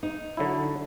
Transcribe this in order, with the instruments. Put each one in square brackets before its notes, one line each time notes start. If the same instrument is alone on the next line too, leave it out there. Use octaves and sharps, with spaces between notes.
[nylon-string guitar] D#4
[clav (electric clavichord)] D3 F#3 E4